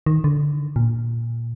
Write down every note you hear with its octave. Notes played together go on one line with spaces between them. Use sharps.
D#3
D3
A#2